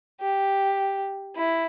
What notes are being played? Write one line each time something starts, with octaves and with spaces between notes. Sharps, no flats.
G4
E4